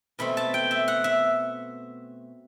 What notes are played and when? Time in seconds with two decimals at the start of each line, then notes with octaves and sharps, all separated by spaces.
0.19 B2 A3 C4 B5
0.37 A5
0.54 G5
0.71 E5
0.88 F#5
1.04 E5